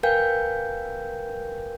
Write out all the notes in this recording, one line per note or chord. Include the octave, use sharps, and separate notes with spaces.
A#4 B4 F5 G5 G#5 G6